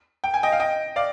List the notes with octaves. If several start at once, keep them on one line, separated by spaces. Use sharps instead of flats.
G5
G#5
D#5 G5
F5
D#5 G5
D5 F5